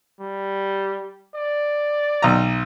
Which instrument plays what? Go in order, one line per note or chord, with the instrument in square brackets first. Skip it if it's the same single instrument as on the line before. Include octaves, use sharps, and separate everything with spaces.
[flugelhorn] G3
D5
[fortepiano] B1 A#5